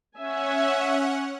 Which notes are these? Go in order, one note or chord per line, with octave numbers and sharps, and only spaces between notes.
C#4 E5 F#5 G#5